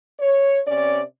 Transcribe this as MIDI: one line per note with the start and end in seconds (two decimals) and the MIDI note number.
0.19 0.60 73
0.66 1.01 48
0.66 1.01 61
0.66 1.01 74